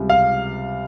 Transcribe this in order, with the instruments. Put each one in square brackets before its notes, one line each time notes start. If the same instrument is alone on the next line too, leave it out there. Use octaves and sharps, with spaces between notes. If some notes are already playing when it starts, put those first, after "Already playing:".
Already playing: [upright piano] C#2 C3 G3
[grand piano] F5